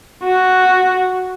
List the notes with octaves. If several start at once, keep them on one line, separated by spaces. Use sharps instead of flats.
F#4